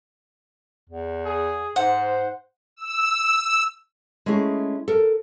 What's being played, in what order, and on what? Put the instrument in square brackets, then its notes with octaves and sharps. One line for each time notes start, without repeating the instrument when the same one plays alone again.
[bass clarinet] E2
[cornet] G#4
[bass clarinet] G#2 [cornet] C5 [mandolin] F#5
[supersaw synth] E6
[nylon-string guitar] G#3 A3 C#4 E4 G#4
A4 A#4